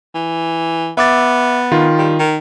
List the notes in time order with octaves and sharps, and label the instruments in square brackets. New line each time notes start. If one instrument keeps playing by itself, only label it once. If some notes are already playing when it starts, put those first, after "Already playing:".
[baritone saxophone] E3
[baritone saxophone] B3 [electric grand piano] E5 D6 A6
[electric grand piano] D#3 F4
[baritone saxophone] G3
D#3